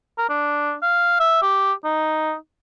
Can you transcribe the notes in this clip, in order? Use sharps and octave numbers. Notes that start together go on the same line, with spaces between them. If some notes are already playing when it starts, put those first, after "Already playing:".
A#4
D4
F5
E5
G4
D#4